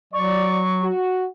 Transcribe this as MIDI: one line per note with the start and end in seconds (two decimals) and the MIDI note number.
0.13 0.89 54
0.13 0.58 74
0.13 0.85 85
0.82 1.25 66